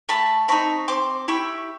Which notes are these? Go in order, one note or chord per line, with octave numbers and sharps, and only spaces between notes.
A3 A5 B5
C4 D#4 B5 C#6
C4 C6 D6
E4 G4 B5 C#6